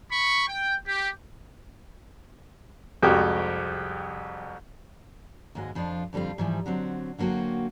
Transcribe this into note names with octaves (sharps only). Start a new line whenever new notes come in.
B5 C#6
G5
G4
C2 F2 G#3 F#4 G4
D#2 G#2 G#3 F#4 D#5
F2 F3 D4 F4
F2 D3 G3 C4 F4
G#2 E3 F3 G3
D3 F#3 C4
D3 F#3 A#3 C4 F#4